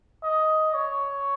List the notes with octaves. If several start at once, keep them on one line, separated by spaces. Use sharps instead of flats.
D#5
C#5